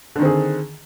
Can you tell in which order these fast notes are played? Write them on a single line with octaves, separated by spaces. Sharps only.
D3 D#3 C4 G#4